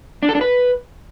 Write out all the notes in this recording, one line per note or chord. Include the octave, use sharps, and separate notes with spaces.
D4
A4
D4
B4